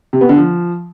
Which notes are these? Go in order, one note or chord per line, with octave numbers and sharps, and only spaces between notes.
C3
B3
D3
F3